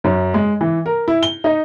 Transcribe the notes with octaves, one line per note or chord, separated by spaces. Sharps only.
F#2
G#3
E3
A#4
E4
G7
D#4